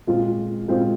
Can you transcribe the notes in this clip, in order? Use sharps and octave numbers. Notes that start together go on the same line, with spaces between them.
A#2 G#3 C4 F4
A#2 G#3 C4 F4